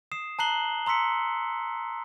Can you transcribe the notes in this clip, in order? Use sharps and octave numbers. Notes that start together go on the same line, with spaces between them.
D#6 C7 E7
A5 A#5 F#6 C7 F#7 G7
A#5 C6 E6 B6 C#7